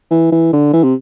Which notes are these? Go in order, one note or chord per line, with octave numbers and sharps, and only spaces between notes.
E3
E3
D3
E3
C3